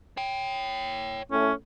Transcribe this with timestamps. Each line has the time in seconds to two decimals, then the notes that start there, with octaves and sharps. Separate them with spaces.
0.17 C#5 G5
1.32 A2 C#4